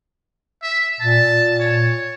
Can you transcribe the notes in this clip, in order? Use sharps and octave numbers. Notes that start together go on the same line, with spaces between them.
E5
A#2 A5
C#5